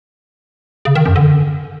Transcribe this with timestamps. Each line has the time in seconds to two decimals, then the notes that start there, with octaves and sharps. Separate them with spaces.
0.85 C#3
0.95 D#3
1.06 F#2
1.16 D3